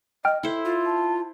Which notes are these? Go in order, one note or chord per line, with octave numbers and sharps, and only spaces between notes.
D#5 G5 F6
E4 A4 C5
F4
A5